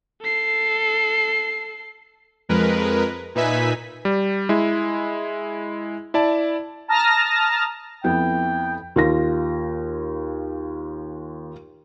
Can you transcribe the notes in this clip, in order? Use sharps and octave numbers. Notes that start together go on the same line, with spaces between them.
A4 C7
F2 G#3 A#4 B4
A#2 D#4 B4 E5 G#5 B6
G3
G#3 E4
E4 D5 A5
A5 A#5 D#6 F6 A#6
F2 B3 E4 G5
D#2 F4 A#6